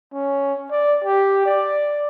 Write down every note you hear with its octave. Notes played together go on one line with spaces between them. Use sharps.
C#4
D5
G4
D5